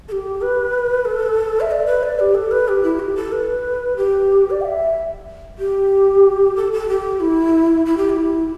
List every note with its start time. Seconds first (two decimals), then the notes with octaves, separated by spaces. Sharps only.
0.09 A4
0.12 G4
0.42 B4
1.05 A4
1.61 E5
1.71 D5
1.86 B4
2.03 D5
2.19 G4
2.35 A4
2.51 B4
2.68 G4
2.83 E4
2.99 G4
3.16 A4
3.32 B4
3.97 G4
4.50 D5
4.61 G5
4.65 E5
5.59 G4
6.56 A4
6.72 A4
6.88 G4
7.20 E4
7.86 E4
7.97 G4
8.09 E4